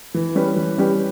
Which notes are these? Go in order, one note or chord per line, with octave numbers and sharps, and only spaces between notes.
E3
G3 C#4 G4 B4
E3
G3 C#4 G4 B4